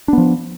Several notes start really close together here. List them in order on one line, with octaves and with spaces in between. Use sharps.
D4 B3 F3